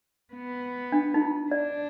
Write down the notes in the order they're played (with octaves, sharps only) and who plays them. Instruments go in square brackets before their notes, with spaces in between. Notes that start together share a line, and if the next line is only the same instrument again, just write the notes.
[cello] B3
[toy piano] D4
D#4
F4
[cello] D4 [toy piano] D5